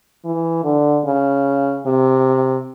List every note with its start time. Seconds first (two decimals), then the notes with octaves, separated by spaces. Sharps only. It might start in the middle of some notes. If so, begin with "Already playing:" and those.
0.25 E3
0.64 D3
1.06 C#3
1.86 C3